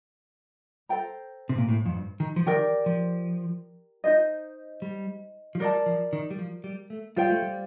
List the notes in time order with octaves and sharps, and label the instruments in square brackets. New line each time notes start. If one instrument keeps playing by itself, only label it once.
[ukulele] A4 C5 G5 A#5
[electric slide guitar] C3
A#2
A2
F2
G2
D#3
F3
[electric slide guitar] D#3 [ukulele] G4 A#4 D5
[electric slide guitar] F3
[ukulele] D#4 G4 C5 D#5
[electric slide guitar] G3
F3
[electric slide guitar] G3 [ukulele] A#4 D5 A5
[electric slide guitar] F3
D#3
G3
F3
G3
A3
[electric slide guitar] G3 [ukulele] F4 C5 G5
[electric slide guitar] A3
G3